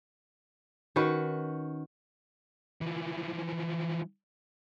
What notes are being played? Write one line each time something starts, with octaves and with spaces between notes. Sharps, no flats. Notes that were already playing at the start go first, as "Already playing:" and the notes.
D#3 C#4 F#4 B4
E3 F3